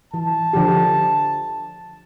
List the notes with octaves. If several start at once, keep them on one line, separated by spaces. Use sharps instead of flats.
E3 A5
D3 F3 G4